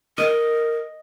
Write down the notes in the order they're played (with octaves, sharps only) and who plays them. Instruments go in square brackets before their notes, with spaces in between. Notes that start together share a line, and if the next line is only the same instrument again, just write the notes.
[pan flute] A#4 [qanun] D#5